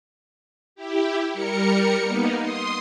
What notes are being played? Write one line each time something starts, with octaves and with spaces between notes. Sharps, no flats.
E4 G4
G3 A#4 C#7
A#3 B3 D#4
C6 D#6